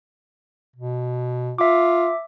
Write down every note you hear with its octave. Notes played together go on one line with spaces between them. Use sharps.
B2
F4 E5 D6